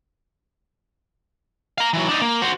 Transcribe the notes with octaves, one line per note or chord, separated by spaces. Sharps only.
F5 A#5
E3 F#3
D4 D#4
A#3
F#4 C5